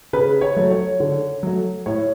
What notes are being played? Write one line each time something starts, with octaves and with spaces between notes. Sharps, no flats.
C#3 B4
C#5
F#3 A3
C#5
D3
F#3 A3
A2 C#5